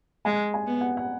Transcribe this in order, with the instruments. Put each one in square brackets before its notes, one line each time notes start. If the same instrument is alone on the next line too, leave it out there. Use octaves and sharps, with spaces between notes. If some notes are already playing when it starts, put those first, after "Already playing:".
[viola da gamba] G#3 [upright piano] G#5
[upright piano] G#5
[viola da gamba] B3
[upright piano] F#5
F#5